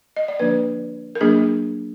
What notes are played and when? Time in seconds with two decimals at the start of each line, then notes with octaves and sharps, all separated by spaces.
0.16 D#5
0.28 D5
0.40 D3 F3 A#3 D4 B4
1.15 A#4
1.21 F#3 A#3 D4 G#4